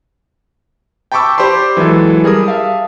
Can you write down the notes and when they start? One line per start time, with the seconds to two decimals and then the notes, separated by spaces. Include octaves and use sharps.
1.12 G5 A5 B5 C#6 D6 E6
1.38 G4 C5 D5 B5 C6
1.77 E3 F#3 G#3 E4 A4
2.24 G3 G#4 A#4 D#6
2.46 E5 F5 A5